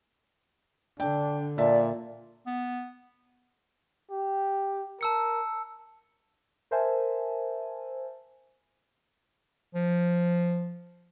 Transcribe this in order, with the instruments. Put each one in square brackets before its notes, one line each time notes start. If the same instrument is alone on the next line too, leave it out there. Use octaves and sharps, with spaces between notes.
[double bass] D3 [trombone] D4 [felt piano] G5
[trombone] A#2 [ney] D5 [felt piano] E5 A5
[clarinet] B3
[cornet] G4
[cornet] A#4 [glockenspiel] A5 E6 C#7
[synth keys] A#4 C5 E5 G#5 A5
[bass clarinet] F3